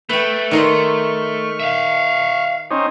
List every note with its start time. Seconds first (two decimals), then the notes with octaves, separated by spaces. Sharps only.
0.09 A3 B4 G5
0.51 D#3 D#4 C6 C#6 F6
1.60 E5 F5
2.71 C4 C#4 D#4